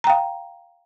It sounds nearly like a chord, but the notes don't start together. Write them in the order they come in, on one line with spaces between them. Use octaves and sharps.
A#5 G5 F5